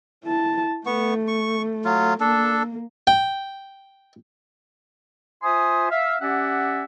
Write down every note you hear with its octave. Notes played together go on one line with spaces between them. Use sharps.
E4 A5
A3 B3 C#6
C#6
F#3 F4
A#3 D4 A4
G5
F4 C5 E5 G#5 C6 D#6
E5 F5
C#4 G4 D5 E5 F#5